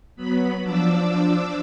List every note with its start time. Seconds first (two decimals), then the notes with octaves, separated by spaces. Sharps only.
0.16 F#3 B3 B5
0.63 F3 D4 D6 E6